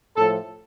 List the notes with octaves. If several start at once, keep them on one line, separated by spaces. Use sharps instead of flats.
A2 F3 A4